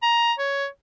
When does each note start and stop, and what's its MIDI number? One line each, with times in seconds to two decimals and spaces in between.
0.03 0.32 82
0.39 0.67 73